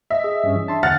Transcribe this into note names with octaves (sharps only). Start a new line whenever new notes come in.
D#5 E5
G#4
G2 C#4
E3
D4 A5 C6
E2 D3 F#5 G#5 F6 A6